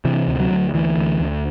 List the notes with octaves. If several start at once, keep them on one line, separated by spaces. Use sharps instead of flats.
C3 E3
D2
F#3
D2
D2 E3
D2
D2